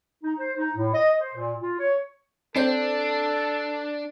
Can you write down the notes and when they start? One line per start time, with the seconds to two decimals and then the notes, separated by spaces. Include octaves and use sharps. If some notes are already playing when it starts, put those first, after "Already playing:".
0.23 D#4
0.39 C5
0.57 D#4
0.76 A2
0.93 D#5
1.20 C5
1.35 A#2
1.61 F4
1.79 C#5
2.56 C4 D4 A4 C5